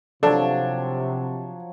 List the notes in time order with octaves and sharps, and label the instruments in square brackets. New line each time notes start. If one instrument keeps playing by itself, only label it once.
[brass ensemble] C3 [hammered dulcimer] F3 F#3 C#5 [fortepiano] D4 [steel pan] A4